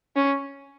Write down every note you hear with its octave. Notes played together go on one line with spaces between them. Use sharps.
C#4